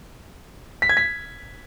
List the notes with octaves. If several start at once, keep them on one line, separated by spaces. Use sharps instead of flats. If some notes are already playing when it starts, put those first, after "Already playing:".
B6
G#6
B6